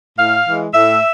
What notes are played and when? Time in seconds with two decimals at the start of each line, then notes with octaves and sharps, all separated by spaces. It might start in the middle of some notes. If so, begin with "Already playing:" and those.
0.18 A2 F5
0.46 E3 G#3
0.74 A2 E5